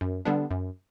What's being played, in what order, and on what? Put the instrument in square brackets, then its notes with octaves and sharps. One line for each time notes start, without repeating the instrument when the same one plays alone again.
[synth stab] F#2
D3 G3 B3 D4
F#2